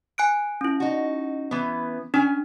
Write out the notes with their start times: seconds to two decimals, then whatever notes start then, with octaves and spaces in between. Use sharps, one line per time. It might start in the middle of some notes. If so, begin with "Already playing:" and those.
0.18 G#5 F#6 D7
0.61 C#4 E4
0.80 D#4 F#4
1.51 E3 B3
2.14 C#4 D4 G#5